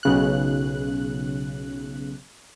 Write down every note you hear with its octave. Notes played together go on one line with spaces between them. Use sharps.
B1 C#3 F#6